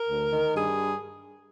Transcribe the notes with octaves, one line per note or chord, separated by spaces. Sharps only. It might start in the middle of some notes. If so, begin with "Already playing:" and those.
Already playing: A#4
D2
D#3
G2 G#4